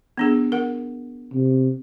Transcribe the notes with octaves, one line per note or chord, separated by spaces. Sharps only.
B3 D4 G#4
A#4 F#5
C3